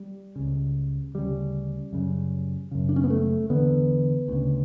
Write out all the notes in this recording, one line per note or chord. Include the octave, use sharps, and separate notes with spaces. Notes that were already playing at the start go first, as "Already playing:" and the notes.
Already playing: G3
C#2 C#3
D2 C#3 G3
F#2 C#3
F#2 C#3
D4
C#4
B3
A3
E2 D3 B3
D2 C#3